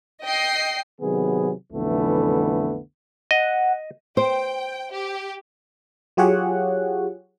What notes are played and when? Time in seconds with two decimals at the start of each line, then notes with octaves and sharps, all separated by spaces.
0.23 D#5 G5 C7
1.01 C3 D#3 F#3 B3 G#4
1.73 B1 F2 D3 E3 A3 B3
3.31 D#5 F#5
4.17 C5 G5
4.92 G4
6.17 F#3 F4 G4 G#4 C#5 F#5